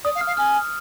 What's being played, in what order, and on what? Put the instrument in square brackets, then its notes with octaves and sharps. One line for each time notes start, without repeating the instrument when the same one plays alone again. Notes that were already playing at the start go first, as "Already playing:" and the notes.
[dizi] D5 [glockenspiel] D#6
[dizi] F5
[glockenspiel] F6
[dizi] F5
[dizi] G#5 [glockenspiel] F6